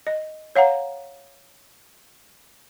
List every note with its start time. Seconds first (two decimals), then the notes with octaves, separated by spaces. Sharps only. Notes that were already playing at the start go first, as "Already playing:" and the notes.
0.07 D#5
0.56 C#5 F5 F#5 A#5